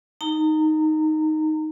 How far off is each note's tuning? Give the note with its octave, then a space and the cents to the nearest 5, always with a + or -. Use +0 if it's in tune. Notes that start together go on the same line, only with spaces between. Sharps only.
D#4 +0 A#5 -30